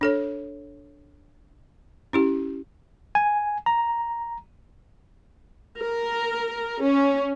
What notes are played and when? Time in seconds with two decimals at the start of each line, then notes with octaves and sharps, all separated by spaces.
0.01 D4 A4 C#5
2.13 C#4 E4 G4
3.15 G#5
3.66 A#5
5.79 A#4
6.82 C#4